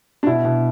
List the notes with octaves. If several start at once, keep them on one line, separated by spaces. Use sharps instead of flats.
D4
B2 E4
B2